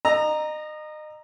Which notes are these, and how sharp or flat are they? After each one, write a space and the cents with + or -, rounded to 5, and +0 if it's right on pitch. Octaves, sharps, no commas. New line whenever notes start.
D#5 -30 A#5 +0 E6 +0